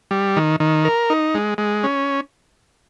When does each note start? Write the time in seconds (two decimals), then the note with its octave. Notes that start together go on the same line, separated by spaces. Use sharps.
0.11 G3
0.37 D#3
0.60 D#3
0.85 A#4
1.10 D#4
1.35 G#3
1.58 G#3
1.84 C#4